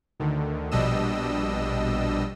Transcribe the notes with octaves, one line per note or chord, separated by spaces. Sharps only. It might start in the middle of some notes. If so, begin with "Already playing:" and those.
D2 D3 D#3
A#1 B2 G3 D4 D#5 E6